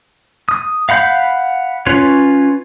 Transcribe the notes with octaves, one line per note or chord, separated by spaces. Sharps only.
D#6
F5 F#5 B5 G6
C#4 F4 B4 C#5